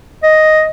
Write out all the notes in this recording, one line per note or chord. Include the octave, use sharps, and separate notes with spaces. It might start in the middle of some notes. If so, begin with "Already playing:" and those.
D#5